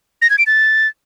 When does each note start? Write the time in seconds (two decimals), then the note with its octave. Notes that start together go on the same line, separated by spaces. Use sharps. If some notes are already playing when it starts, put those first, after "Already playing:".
0.22 A#6
0.30 G#6
0.38 D7
0.46 A6